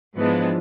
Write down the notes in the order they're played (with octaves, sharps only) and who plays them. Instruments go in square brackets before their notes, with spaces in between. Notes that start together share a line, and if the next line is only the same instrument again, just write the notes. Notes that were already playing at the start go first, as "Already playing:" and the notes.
[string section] G#2 E3 G#3 B3 D4 [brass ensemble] F3